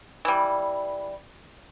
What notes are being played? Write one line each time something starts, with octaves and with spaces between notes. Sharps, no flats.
E3 G3